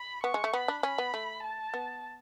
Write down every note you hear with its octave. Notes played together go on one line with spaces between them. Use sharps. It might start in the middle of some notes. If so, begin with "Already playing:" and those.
Already playing: B5
B3 C#6
G#3
A3
B3 B5
D4
C#4 B5
B3
A3
A5
B3